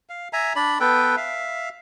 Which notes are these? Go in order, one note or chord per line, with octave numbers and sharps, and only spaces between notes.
F5
E5 G#5 A#5
D4 D5 B5
B3 A4 B4 G5
E5 F5